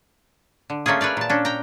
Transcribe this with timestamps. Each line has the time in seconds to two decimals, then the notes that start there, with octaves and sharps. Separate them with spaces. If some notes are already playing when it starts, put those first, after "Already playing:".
0.70 D3
0.86 A3 A#3 C#4 F4 G#4
1.01 B4 C#5 D5 F5
1.17 A#2 A5
1.30 C#4 D4
1.45 G5 A#5